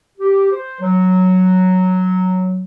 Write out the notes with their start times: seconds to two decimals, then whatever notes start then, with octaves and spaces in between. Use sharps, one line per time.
0.18 G4
0.51 C5
0.81 F#3